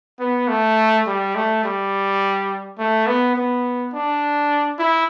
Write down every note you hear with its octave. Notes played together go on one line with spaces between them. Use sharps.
B3
A3
G3
A3
G3
A3
B3
B3
D4
E4